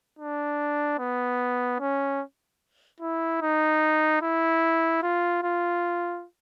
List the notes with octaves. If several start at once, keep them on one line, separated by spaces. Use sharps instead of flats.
D4
B3
C#4
E4
D#4
E4
F4
F4